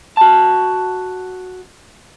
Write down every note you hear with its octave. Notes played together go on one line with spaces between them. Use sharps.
F#4 A5